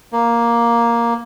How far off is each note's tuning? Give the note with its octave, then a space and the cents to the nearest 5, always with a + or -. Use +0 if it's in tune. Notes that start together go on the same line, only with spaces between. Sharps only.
A#3 +5